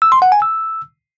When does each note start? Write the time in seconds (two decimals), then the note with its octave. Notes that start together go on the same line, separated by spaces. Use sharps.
0.02 E6
0.12 C6
0.22 F#5
0.32 G#5
0.42 E6